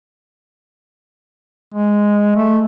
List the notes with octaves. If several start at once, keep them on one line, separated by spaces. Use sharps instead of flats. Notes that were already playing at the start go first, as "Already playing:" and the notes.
G#3
A3